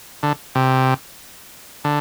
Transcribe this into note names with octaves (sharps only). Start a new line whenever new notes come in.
D3
C3
D3